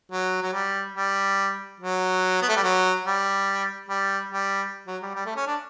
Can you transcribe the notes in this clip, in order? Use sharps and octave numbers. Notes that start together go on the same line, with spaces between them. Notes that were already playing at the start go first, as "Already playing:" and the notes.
F#3
F#3
G3
G3
F#3
B3
A3
G3
F#3
G3
G3
G3
F#3
G3
G3
A3
C#4
D4